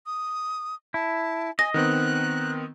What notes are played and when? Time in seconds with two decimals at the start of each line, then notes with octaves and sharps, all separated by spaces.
0.06 D#6
0.94 E4 A5
1.59 D#5 G#5 A#6
1.74 D#3 B3 C4 F#6